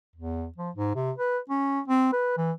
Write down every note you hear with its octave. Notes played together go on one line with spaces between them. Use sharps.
E2
F3
G#2
C3
B4
C#4
C4
B4
E3